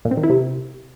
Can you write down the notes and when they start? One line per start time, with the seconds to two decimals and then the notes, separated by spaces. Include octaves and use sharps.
0.05 A#2
0.11 C4
0.17 D#3
0.23 E4
0.30 C3